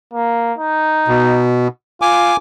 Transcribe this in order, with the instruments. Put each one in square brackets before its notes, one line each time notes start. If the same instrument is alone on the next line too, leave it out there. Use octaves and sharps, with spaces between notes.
[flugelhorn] A#3
D#4
[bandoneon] B2
[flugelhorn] F4 [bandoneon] G#5 D6